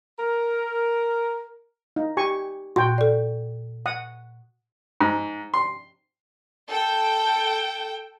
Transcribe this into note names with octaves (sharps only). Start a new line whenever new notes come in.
A#4
D#4
G4 G#5 C#6
A#2 F#4 G5 C6
A4 D5
F#5 D#6
G#2
C6
A4 G5